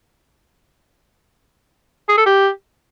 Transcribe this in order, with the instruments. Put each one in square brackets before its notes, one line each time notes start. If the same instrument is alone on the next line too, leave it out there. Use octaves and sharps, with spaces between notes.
[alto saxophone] G#4
A4
G4